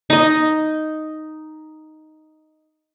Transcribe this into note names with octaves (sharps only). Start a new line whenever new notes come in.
D#4 D#5